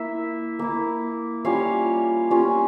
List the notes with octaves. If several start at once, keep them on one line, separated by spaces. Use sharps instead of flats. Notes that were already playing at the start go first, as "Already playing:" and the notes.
Already playing: A#3 E4 E5
A#3 E4
G3 C#4 F4 C#5 F5
G3 C#4 F4